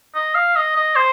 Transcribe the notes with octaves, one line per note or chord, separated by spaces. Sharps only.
D#5
F5
D#5
D#5
C5